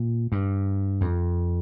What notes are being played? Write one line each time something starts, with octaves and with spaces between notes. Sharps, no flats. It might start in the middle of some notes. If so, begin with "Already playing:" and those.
Already playing: A#2
G2
F2